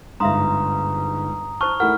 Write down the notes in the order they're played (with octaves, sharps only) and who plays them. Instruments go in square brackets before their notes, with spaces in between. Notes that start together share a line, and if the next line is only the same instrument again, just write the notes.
[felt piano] G1 G#2 [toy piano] E5 F5 C6 [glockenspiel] A#5 D#6
[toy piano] E4 C5 A5 [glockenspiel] C#6 [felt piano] F6
[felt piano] A3 E4 A#4 [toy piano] D#4 F#5 [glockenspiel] F6